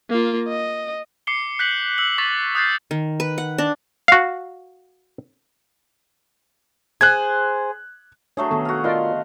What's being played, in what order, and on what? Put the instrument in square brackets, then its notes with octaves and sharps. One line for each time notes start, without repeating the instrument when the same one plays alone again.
[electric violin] A#3 F4
D#5
[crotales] D6 C7 C#7 G7
F#6 G6 B6 C7 F#7
E6 F#7
C#6 D6 A6 B6
D#6 F#6 G6 A6 C7
[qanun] D#3
B4
F#5
D4
[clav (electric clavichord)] F#4 F5
[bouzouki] G#4 C5 [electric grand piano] F#6 G#6
[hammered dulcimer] F#3 A3 G#4 [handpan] D4 [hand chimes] C#5
[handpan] D#3 B3 A4 [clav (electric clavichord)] A5
[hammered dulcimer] F#4 F5
[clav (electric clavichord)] F4 A#4 D5 [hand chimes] D#5 F5 [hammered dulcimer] C6